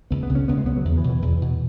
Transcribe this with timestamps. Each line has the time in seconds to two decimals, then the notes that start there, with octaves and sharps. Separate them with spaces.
0.11 C#2 B3
0.23 B3
0.29 C#3
0.35 C#4
0.48 C#2 B3
0.58 G#3
0.66 C#3 B3
0.76 F#3
0.85 E2
0.98 E3
1.04 B2
1.10 E3
1.22 E2
1.42 B2